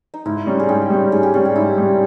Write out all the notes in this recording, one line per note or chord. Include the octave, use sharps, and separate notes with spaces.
D#4
G#2 E4
G3 C#4
G#4
G#2 G4
G3 C#4
G#2 G#4
G4
G3 C#4 G#4
G4
G#2 E4
G3 C#4